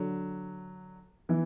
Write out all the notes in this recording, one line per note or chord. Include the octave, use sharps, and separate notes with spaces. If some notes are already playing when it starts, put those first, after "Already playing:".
Already playing: D3 F#3 D4
E3 B3 E4